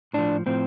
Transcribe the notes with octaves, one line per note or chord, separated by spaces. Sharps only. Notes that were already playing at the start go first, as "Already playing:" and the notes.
A2 F3 D4
A2 F3 C4